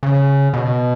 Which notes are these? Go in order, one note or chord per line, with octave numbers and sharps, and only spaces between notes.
C#3
B2